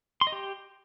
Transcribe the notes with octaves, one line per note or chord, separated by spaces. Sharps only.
C6
D#5
G4